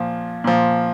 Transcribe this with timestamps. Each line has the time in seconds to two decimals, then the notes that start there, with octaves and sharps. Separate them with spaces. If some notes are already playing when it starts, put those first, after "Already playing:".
Already playing: A#2 F3
0.44 A#2 F3